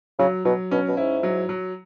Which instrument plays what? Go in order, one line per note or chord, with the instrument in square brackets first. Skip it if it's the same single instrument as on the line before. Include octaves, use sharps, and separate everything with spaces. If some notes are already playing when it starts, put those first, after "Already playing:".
[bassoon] C#3 [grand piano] F#3
[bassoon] B2 [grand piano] F#3
[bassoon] B2 [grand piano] C#4
[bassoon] B2
[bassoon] G#2 [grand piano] E4
[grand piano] F#3
F#3